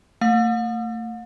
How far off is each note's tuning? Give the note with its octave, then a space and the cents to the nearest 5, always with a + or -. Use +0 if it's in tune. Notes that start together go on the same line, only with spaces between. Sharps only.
A3 +35 F5 +45